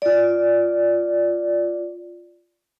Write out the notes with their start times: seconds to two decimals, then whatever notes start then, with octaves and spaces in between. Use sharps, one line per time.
0.02 F4 D5